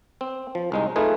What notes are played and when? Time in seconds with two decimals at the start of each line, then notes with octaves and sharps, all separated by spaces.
0.21 C4
0.55 F3
0.72 C2 G#3 D#4
0.96 A3 D#4 F4 G#4 B4